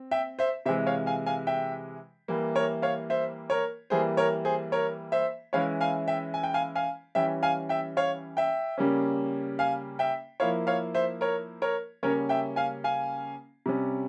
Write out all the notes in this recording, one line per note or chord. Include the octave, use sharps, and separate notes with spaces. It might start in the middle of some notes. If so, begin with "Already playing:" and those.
Already playing: C4
E5 G5
C5 E5
C3 E3 G#3 C5 E5
C#5 F5
F5 G#5
F5 G#5
E5 G5
E3 G3 A#3 E4
A#4 C#5
C#5 F5
C5 E5
A#4 C#5
E3 G3 A#3 G#4 C5
A#4 C#5
G#4 C5
A#4 C#5
C5 E5
E3 G#3 C#4 E4 C#5 F5
F5 G#5
E5 G5
G#5
G5
F5 G#5
F5 G#5
E3 G3 C#4 E5 G5
F5 G#5
E5 G5
C#5 F5
E5 G5
C#3 G3 A#3 C#4
F5 G#5
E5 G5
F3 A#3 E4 C#5 F5
C#5 F5
C5 E5
A#4 C#5
A#4 C#5
C#3 G3 A#3 C#4 A#4 C#5
E5 G5
F5 G#5
F5 G#5
C3 G3 C#4